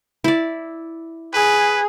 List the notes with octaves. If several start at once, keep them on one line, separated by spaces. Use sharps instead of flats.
E4 D5
G#4 B4